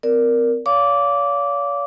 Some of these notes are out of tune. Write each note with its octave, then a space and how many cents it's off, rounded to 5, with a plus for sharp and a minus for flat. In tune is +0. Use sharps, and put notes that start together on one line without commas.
C4 -35 A#4 +0 D5 +0
C#5 +45 F5 +0 D6 -15